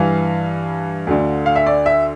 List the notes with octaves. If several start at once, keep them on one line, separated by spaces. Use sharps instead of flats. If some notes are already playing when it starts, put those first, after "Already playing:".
Already playing: G2 E3 F5
D2 D3
F5
E5
D5
E5